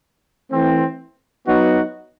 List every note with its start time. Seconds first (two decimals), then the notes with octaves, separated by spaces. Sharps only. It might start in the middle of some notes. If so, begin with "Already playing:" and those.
0.51 E3 A3 C4
1.47 F#3 B3 D#4 F#4